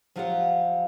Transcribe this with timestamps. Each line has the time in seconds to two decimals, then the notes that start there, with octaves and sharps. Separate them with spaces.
0.16 F3 F#3 F4 G4 F5 F#5